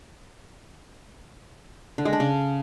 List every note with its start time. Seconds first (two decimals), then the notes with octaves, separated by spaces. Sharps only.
1.98 D3
2.05 G#3
2.13 D4
2.20 C#3